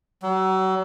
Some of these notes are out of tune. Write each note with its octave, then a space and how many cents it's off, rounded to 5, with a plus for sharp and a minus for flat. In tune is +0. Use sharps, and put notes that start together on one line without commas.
F#3 +35